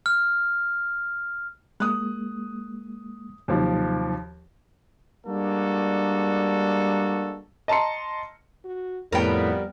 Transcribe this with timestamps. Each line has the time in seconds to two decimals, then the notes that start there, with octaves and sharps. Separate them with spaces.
0.06 F6
1.80 G#3 A#3 D#6 F#6
3.48 D#2 C3 F3 F#3 D#4
5.26 G3 G#3 A#3 D4 F#4 A4
7.68 D#5 A5 A#5 C6 C#7
8.65 F#4
9.12 F2 A2 G3 B3 A#4 G5